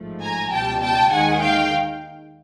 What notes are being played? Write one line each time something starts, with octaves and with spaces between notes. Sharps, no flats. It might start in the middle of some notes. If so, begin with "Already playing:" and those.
Already playing: A1 G#2 F3 A3
G#5 A#5
C#2 B2 G3 G5 A5
G5 A5
D#2 D#3 G#3 F#5 G#5
F5 G5